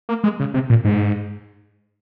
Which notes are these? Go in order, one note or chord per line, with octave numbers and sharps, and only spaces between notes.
A#3
G#3
C#3
C3
A#2
G#2